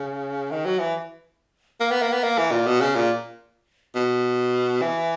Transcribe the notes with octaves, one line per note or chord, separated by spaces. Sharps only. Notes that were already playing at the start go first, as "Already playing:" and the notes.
Already playing: C#3
D#3
F#3
E3
A#3
B3
A#3
B3
A#3
E3
A#2
B2
C#3
A#2
B2
E3